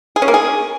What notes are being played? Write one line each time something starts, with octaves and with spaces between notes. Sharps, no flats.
G#4
C#4
A#3
G#4